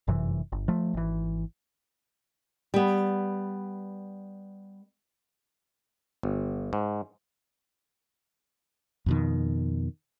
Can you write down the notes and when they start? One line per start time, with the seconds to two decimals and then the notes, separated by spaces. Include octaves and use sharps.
0.07 G1 F#2 C3 E3
0.52 G1
0.68 F3 A3
0.94 G#1 E3
2.74 G3 B3
6.23 G1
6.73 G#2
9.06 F2 B2 D#3